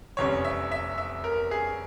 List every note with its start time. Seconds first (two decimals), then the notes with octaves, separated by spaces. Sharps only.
0.17 F1 E2 C3 G3 C#4 C#5
0.45 E5
0.72 E5
0.98 E5
1.24 A#4
1.51 G#4